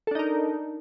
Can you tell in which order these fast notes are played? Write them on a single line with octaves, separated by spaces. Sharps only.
A4 D4 D#4 A#4